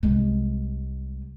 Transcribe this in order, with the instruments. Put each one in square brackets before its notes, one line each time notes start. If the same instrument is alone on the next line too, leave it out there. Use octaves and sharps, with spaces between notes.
[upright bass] C2 G#3